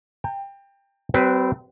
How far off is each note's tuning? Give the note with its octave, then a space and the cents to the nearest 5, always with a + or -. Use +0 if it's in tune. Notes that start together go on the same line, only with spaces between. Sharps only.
G5 +20 A#5 -40
F#3 +45 C4 -25 B4 +0